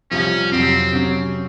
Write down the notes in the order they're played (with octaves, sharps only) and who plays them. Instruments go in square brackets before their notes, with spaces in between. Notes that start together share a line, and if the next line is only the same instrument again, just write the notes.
[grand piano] C2 C3 F3 [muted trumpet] C#4
[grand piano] F2 C3 F#3 [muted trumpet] C4
[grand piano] C3 F#3 C#4